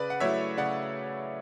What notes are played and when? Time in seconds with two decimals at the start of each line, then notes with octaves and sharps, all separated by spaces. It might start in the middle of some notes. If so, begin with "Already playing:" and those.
Already playing: C#3 B4 D5
0.10 F#5
0.20 F#3 A3 E4 C#5 E5
0.57 C#3 D5 F#5